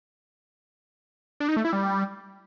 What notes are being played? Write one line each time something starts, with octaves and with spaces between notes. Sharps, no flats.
D4
D#4
A3
E4
G3